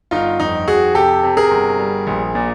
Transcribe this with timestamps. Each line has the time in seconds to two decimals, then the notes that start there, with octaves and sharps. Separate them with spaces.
0.11 G1 D#4 F4
0.40 F2 D#4
0.67 F2 F#4 G#4
0.95 C3 G4 A4
1.23 C3
1.37 G#4 A#4
1.51 G1
1.79 G3
2.07 A#1
2.35 A#2